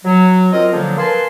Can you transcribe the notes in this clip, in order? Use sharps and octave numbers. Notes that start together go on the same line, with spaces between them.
F#3
C4 F4 A#4 D#5
D3 F3 F#3 A#3
A#4 B4 F5 G#5 A5 C6